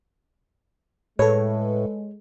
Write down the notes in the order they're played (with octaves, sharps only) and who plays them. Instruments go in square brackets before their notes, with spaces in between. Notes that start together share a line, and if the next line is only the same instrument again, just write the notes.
[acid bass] A2 [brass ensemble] G#3 [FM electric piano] A4 B4 [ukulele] C#5